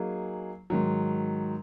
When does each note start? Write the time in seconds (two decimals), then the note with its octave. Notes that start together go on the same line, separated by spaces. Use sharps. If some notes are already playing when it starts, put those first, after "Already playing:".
Already playing: F#3 A#3 D#4 G#4
0.70 G#2 D#3 F#3